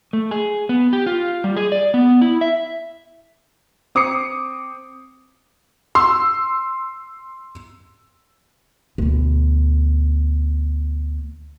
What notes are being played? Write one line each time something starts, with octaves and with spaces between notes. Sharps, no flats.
A3
G#4
B3
G4
F4
G3
G#4
D5
B3
E4
E5
C4 D6 D#6 C7 C#7
C6 E6
D2 B2